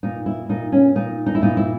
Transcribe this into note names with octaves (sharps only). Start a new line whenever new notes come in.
A#2 D#4
E4
A#2 D#4
C#4
A#2 D#4
D#4
E4
A#2 D#4
E4